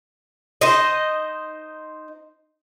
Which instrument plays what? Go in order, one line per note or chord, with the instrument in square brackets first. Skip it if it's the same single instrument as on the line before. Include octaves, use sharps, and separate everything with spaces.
[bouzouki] D#4 C5 D#5